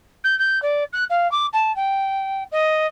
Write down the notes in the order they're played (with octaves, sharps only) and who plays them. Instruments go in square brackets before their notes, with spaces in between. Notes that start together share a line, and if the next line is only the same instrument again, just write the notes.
[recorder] G6
G6
D5
F#6
F5
D6
A5
G5
D#5